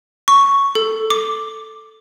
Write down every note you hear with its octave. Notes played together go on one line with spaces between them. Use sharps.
C#6
A4
D6